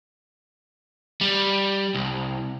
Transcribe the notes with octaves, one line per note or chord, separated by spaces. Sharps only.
G3
C2